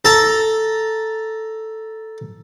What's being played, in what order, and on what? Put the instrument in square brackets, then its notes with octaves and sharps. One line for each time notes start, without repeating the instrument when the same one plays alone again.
[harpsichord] A4 A5 A#5